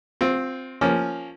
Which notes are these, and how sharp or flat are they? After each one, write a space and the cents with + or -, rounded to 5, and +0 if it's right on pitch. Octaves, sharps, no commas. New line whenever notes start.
C4 +0 F4 +25
F3 +0 A#3 +0 C#4 +0